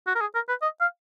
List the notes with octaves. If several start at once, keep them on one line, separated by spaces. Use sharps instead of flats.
F#4
A#4
G#4
A#4
B4
D#5
F5